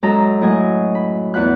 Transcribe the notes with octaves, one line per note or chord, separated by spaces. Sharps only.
F#2 G#3 C#4 A4 D#5 A#5
A2 F#3 D#5 G#5
B5
E2 F#5 B5 F#6